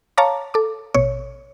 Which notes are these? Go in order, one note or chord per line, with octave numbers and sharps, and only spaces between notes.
C#5 F5 A5 A#5 D6
A4 D6
A1 B2 C#5